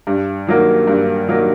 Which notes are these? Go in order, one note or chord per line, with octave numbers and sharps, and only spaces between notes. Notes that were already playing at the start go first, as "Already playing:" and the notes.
G2
D#3 F#3 A#3
G2
D#3 F#3 A#3